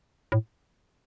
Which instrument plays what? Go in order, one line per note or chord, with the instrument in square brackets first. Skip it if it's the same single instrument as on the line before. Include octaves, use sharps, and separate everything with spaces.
[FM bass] A2